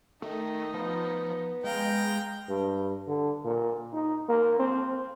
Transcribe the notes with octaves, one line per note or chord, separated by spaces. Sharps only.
D#3 A3 D#4
F3 B3
G#3 F5 G5 A#5
G2
D3
A#2
D#4
A#3
C4